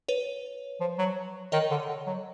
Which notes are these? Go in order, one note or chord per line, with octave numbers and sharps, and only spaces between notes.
B4 C#5
F3
F#3
D#3 C#5 D#5
D3
D3
F#3